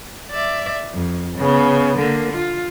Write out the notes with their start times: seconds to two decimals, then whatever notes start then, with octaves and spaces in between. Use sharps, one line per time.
0.31 D5 E5
0.93 F2
1.37 C#3 B3
1.97 D3 A#3
2.31 F4